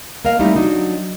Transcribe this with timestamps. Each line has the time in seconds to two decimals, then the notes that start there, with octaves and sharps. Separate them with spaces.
0.25 A#3 A#4 D#5 F5
0.39 G3 A3 C4 D#4 E4
0.55 F#3 D4 D#4 F#4